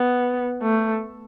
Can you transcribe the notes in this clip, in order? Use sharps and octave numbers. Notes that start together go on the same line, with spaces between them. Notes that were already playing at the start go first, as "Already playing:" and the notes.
Already playing: B3
A3